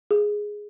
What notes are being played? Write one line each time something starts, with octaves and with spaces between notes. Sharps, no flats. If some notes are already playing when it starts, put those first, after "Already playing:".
G#4